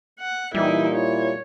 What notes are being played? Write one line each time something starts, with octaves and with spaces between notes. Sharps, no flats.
F#5
A#2 E3 G3 D#4 E4
E4 C#5